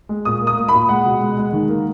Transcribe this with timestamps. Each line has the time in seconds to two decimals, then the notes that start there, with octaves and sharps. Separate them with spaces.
0.09 G#3
0.25 A#2 D#6
0.42 A#3
0.47 D#6
0.57 A#3
0.68 B5
0.74 A#2
0.89 G#3 F#5
1.06 B2
1.21 G#3
1.37 G#3
1.53 D#3
1.68 A#3